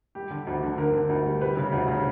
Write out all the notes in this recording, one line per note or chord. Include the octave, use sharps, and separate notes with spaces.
G3 G4
D3
D2
D3
D3 A#4
D3
D2
G3
G3 B4
C#3
D2
C#3